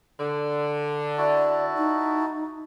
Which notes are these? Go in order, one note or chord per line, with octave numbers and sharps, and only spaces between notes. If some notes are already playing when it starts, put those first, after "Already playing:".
D3
E4 F#4 D5 A5
D#4